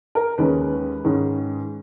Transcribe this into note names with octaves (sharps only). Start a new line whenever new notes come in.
A#4
D#2 D#3 G#3 C#4 B4
G#2 D#3 G#3 C#4